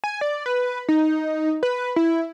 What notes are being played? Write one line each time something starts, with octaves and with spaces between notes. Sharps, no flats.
G#5
D5
B4
D#4
B4
E4